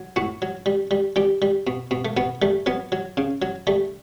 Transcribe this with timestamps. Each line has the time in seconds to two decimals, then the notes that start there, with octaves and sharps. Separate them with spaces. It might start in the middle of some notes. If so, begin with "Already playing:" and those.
Already playing: F#3
0.16 A2 F#4
0.42 F#3
0.66 G3
0.91 G3
1.16 G3 G4
1.42 G3
1.67 B2
1.91 B2
2.05 A3
2.17 B2 B3
2.42 G3 A3
2.66 F#3 B3
2.92 F#3
3.17 C#3
3.42 F#3
3.67 G3 A3